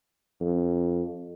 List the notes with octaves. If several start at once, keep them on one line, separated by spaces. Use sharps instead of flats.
F2